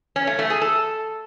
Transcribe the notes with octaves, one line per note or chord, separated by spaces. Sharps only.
C#4
A3
A3
G#4
A4